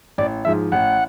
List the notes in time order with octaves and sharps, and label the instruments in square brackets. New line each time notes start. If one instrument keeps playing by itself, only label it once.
[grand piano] A1 [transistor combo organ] D5
[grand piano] G#2 F3 G#3 [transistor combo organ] E5
[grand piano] A1 [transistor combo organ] F#5